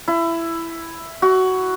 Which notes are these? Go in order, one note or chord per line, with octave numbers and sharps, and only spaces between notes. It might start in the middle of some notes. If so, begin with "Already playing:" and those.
E4
F#4